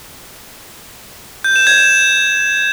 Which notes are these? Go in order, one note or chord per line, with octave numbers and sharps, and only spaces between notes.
G6
E7
G#6
E7